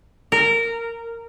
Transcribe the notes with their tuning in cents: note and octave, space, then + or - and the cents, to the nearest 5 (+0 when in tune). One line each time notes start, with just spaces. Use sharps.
A#4 -15